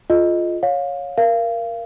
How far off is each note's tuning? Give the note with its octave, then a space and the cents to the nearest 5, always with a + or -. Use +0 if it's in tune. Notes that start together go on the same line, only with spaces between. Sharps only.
F4 +0 A4 -45 D#5 +0
C#5 +0 F5 +25
A#4 +10 F5 -30